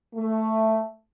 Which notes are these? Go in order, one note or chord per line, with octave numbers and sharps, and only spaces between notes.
A3